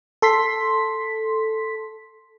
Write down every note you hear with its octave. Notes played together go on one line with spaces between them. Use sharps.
A4 C6 B6